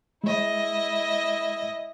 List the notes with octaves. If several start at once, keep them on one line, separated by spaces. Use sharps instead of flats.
G#3 E4 D#5